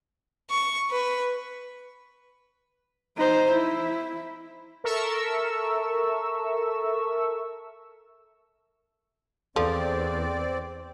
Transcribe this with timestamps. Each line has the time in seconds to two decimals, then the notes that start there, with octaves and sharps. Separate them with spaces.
0.50 C#6
0.90 B4
3.16 D#4 C5
3.52 E4
4.84 A4 A#4 E5 C#6 E6
9.56 E2 F3 C4 A4 D5